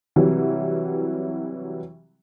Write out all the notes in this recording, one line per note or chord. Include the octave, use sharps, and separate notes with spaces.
C3 E3 F#3 G3